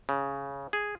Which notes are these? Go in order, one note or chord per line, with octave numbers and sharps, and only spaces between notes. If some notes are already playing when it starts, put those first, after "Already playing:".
C#3
G#4